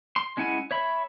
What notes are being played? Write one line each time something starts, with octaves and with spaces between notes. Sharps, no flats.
C6
G#3 C#4 E4 F#5 G#5
C#5 E5 B5